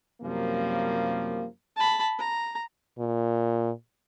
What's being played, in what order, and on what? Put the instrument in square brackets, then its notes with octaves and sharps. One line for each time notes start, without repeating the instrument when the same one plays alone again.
[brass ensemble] F#2 C3 F3 G3 A#3
[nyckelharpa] A5 B5
A#5
[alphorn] A#2